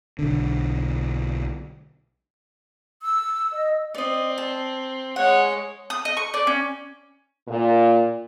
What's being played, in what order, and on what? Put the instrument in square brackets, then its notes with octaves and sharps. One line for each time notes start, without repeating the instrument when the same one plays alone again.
[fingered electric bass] B1 D3
[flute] E6
[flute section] D#5
[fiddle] C4 [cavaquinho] D5 D#5
[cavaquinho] A5
[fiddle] G#3 C#5 [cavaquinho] F#5
[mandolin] D#6
D#5
C#6
D5
C#4
[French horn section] A#2